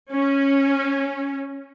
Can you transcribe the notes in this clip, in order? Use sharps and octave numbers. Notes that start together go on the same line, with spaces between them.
C#4